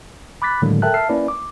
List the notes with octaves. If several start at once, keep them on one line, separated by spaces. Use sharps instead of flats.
B5 D6 F#6 A6 B6
A2 D3 D#3 F#3 G#3 A#3
A4 A#4 E5 G5 A5 F#6
E5 A5 F6 C7
A#3 C#4 E4 B4 D5
D6